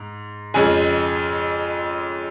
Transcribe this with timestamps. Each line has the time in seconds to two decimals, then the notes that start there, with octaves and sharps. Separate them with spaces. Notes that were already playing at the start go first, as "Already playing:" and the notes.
Already playing: G#2
0.54 F2 C#3 G#3 G#5